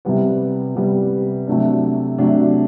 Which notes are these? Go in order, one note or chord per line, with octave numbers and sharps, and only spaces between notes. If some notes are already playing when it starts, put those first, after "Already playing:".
C3 G3 B3
C3 G3 B3
C3 F#3 A3 D4
C3 F#3 A3 D4